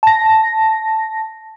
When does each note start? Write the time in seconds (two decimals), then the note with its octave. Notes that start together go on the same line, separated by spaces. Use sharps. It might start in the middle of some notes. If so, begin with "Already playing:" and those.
0.03 A5 A#6